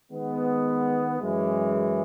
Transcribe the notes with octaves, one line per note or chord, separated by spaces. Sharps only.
D#3 G#3 B3
F#2 E3 G#3